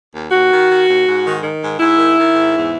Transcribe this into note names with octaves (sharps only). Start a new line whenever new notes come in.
D#2
D#2 F#4
D#3
D#3
D#2
G#2
D#3
D#3
G#2
G#2 E4
D#3
D#3
G#2
E2